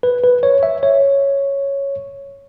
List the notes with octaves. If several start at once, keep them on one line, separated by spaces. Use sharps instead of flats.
B4
B4
C#5
E5
C#5